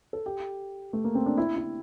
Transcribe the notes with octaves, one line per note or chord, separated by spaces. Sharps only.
A4
G4
A3
A#3
C4
D4
E4
E4